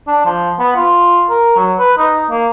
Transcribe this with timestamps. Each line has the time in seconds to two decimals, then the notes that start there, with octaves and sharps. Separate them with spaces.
0.07 D4
0.26 F3
0.60 B3
0.76 F4
1.30 A#4
1.56 F#3
1.79 B4
1.98 D#4
2.31 A#3